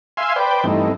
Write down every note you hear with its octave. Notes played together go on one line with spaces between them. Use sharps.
E5 F5 G#5 C6
B4 C5 D5 G5
G2 E3 A3 C4 D#4